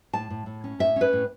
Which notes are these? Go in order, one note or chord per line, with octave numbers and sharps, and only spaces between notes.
A2 A5
A2
A2
C#4
A2 E5
C#4 B4
A2